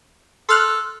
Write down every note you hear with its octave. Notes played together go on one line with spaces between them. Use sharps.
A4 C6 F6 F#6